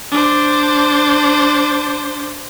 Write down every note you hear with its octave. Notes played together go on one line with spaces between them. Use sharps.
D4 C5